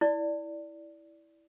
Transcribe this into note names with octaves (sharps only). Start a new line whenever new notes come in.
E4 D5